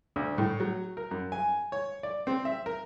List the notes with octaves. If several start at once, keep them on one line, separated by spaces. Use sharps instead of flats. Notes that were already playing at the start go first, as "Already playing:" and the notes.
D2
A2
F#3
A#4
F#2
G#5
C#5
D5
C4
E5
A#4